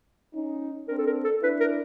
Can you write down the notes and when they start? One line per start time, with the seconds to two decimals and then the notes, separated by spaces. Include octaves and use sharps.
0.33 C#4 D#4
0.87 C4 D4 A#4
0.98 A4
1.06 A#4
1.24 A4
1.42 D4 E4 B4
1.60 A#4